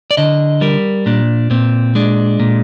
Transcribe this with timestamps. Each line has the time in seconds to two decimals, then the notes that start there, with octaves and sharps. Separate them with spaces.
0.11 D5
0.17 D3 D#5
0.61 G3 A#4
1.06 A#2 D4
1.51 A#2 C4
1.95 G#3 D4
2.40 A#2